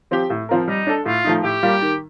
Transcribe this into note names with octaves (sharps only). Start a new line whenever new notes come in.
F3 C4 G4
A2
F3 C4 F4 A#4
G3 D#4
D4 A4
A2 F4
F3 A3 D#4
A2 G4
G3 A#3 F4
D#3